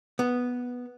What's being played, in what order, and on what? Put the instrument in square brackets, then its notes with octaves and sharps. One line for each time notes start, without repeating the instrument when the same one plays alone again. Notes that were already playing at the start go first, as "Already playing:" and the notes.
[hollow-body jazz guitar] B3